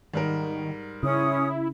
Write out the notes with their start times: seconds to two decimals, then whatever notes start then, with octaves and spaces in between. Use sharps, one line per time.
0.14 G#2 D#3 G3 A#4
1.03 C#3 C#4 E4 D#6